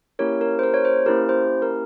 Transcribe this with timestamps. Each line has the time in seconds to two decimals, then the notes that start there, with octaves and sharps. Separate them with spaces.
0.19 A#3 C#4 E4 G4 A#4 C#5
0.41 A#4
0.59 C5
0.63 A#4
0.74 C#5
0.85 C5
1.06 A#3 C#4 E4 G4 A#4
1.29 C5
1.62 A#4